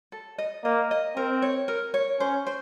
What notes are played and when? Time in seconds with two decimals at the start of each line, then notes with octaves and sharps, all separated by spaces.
0.12 A4
0.38 D#5
0.64 A#3 D#5
0.91 D#5
1.16 C4 A#4
1.42 C#5
1.68 A#4
1.94 C#5
2.20 C#4 C5
2.47 C5